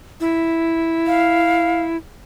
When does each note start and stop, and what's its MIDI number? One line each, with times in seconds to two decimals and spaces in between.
0.20 1.97 64
1.07 1.82 77